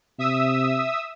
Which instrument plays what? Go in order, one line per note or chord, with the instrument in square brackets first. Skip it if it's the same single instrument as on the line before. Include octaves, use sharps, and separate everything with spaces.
[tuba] C3 [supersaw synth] E5 D#6 E6